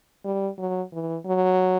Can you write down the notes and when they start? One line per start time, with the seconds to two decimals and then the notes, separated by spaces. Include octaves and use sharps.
0.25 G3
0.58 F#3
0.93 E3
1.26 F#3